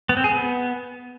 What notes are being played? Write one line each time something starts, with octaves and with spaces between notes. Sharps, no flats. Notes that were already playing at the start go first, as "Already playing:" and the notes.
B3
C4
G#4
B3